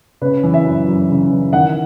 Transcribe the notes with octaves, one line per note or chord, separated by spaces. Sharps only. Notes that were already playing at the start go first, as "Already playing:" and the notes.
C#3 B4
E3
E5
F#2
F#2
C#3
E3
D#3 F#5